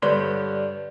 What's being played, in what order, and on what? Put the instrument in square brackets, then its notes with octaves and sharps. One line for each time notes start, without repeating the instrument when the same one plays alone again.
[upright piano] G2 D3 [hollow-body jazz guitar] B4 C#5 C6 [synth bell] D5